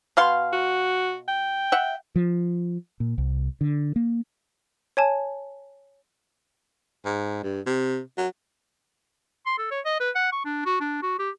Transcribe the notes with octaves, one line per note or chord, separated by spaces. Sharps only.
B2 F5 C6
F#4
G5
E5 F#5
F3
A#2
C2
D3
A#3
C#5 G#5 A5
G#2
G2
C3
F#3
C6
A4
C#5
D#5
B4
F#5
C#6
D4
F#4
D4
F#4
G4